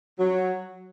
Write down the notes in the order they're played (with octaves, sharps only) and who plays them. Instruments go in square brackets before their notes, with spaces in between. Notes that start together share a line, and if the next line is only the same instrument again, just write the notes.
[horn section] F#3